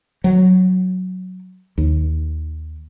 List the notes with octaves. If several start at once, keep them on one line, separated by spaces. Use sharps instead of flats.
F#3
D#2